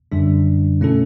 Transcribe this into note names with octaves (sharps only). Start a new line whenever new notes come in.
F#2 D3 G3 D4
B2 A3 C#4 E4 A4